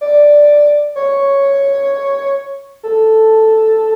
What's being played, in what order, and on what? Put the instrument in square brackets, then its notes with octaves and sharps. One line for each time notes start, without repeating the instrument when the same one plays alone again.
[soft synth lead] D5
C#5
A4